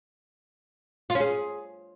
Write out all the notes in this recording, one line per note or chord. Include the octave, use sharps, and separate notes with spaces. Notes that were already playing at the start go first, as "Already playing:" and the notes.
F4
C#4
G#4